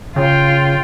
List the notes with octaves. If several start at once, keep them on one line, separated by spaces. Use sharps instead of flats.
C#3 F4 G5